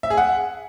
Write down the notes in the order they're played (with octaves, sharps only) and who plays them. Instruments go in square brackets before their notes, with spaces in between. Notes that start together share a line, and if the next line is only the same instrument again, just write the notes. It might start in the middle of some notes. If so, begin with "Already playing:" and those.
[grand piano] E5
G#4
F#5